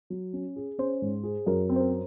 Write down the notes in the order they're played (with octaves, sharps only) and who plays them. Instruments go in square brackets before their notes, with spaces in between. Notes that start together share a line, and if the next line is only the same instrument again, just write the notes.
[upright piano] F#3
C#4
G#4
[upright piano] C#4 [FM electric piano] C5
[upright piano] G#2
G#4
[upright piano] F#2 [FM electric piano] A#4
[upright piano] C4
[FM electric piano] C5
A#4